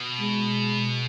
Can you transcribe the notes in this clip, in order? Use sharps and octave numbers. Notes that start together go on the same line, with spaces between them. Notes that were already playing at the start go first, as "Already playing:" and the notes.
Already playing: B2
G#3